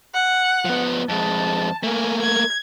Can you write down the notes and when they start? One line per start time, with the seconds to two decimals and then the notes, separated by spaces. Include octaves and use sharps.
0.14 F#5
0.65 F3 B3
1.09 F2 G#3 A5
1.83 A3 A#3 G#5
2.22 G#6